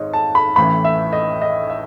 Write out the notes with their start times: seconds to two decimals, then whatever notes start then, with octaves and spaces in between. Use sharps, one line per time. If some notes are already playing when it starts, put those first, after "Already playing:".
Already playing: G#1 G#2 C#5 D#5
0.13 A5
0.35 B5
0.56 A1 A2 E3 B5
0.85 E5
1.13 D#5
1.42 D#5
1.70 E5